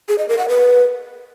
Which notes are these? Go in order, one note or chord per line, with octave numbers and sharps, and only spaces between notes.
G#4
D#5
A#4
F#5
B4